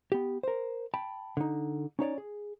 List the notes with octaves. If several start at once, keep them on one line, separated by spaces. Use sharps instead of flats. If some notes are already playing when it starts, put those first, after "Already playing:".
B3 G4
A#4 C5
G5 A5 B5
D3 D#4
C#4 D#4 C#5 D5
G#4